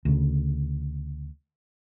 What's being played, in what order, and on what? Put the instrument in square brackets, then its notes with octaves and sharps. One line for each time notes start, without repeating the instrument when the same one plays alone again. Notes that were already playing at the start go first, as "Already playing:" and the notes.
[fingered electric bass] D2 C#3